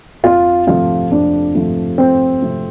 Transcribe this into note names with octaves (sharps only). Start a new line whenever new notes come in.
F2 F4
C3 F3 A3 F4
F2 D4
C3 F3 A3
F2 C4
C3 F3 A3